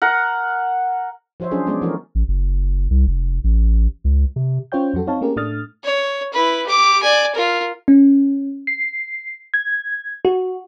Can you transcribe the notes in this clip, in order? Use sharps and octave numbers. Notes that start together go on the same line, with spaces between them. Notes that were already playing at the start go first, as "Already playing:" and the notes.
A#4 F#5
F3 F#4 C5 C#5 E5
F#3 C#4 D4 F4 G#4 C5
G#3 B3 C#4 G#4 D5
E3 F3 A3 F#4 A#4
A1
F#1
C2
F1
A1
C#2
C3
C#4 F4 C5 C#5 G5 G6
F2 F#3 F#4 A4
C4 D#4 C#5 F5 A5
A3 A#3 C#4 G4 G#4 A#4
A2 A3 D4 D#6 F6 A6
C#5
E4 B4
G4 D6
D5 G#5
F4 A#4
C#4
C7
G#6
F#4